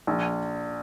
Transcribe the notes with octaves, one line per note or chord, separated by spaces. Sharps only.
A#1